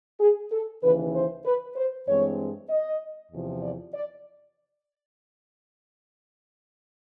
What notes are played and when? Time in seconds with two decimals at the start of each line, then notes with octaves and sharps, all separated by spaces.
0.20 G#4
0.52 A4
0.83 D#2 C#3 E3 B4
1.14 C5
1.46 B4
1.76 C5
2.07 G2 E3 G#3 C4 C#5
2.69 D#5
3.32 E2 C3 F3
3.62 D5
3.94 D5